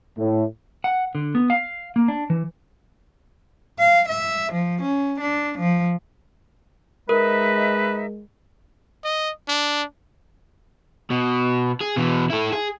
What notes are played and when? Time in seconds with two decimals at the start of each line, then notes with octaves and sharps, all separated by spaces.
0.18 A2
0.84 F#5
1.15 D3
1.35 B3
1.50 F5
1.96 A#3
2.08 D4
2.30 E3
3.79 F5
4.09 E5
4.53 F3
4.82 C#4
5.21 D4
5.59 F3
7.09 G#3 D#4 A#4 B4 E5
9.05 D#5
9.48 D4
11.11 B2
11.81 G#4
11.97 B2 E3
12.31 E4 A4
12.53 G#4